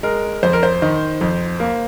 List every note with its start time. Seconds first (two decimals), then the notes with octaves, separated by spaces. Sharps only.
0.03 G#3 A#4
0.43 F2 C5
0.53 A#4
0.63 C5
0.82 D#3
1.21 F2
1.60 A#3